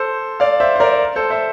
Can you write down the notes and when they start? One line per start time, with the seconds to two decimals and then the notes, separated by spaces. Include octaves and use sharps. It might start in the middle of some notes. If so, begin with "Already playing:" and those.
Already playing: A4 C5
0.40 D5 F5
0.60 C5 E5
0.76 C5
0.80 A#4 D5
1.16 A4 C5
1.30 C5 E5